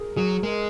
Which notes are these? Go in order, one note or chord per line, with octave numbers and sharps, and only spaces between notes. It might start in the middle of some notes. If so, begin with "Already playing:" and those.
Already playing: G#4 A#4
F#3 G#4
G#3 A#4